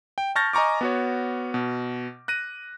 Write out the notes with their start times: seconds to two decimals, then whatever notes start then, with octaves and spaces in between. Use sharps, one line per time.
0.18 G5
0.35 A5 C#6 F6 G6 A6 A#6
0.53 D#5 G#5 A#5 C#6 D6
0.81 B3 F#4 C#5
1.54 B2
2.28 F#6 A#6 D#7